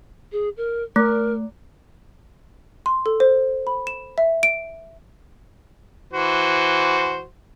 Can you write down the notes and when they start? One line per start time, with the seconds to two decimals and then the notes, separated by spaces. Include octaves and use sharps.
0.32 G#4
0.57 A#4
0.96 A3 A#4
2.86 C6
3.06 A4
3.20 C5
3.67 B5
3.87 E7
4.18 E5
4.43 D7
6.13 E3 F#4 C5